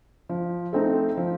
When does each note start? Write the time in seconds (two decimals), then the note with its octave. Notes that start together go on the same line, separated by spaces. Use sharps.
0.29 F3
0.73 A3 C4 D#4
1.17 F3